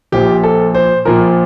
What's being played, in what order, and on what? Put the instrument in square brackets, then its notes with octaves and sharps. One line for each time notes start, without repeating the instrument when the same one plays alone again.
[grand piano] A#1 A#2 F3 G4
A4
C5
A#1 A#2 F3 A#4